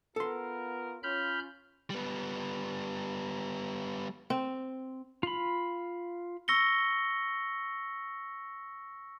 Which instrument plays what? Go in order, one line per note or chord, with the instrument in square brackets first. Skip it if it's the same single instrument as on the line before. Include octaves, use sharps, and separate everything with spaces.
[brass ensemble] B3 F4 A#4 [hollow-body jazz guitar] A4 C6
[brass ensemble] C#4 F4 [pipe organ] B5 F6 G6
[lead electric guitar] G3 B3
[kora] C4
[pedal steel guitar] F4 B5
[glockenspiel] C#6 E6 A#6 C#7 G7